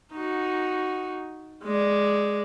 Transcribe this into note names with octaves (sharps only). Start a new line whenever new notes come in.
D#4 F#4
G#3 D5